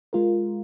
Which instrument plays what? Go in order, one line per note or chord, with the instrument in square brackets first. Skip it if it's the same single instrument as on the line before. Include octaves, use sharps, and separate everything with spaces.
[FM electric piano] G#3 F4 A#4